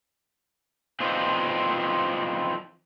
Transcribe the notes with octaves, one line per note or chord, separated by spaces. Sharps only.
E3 F3 C4 D4 D#4 F4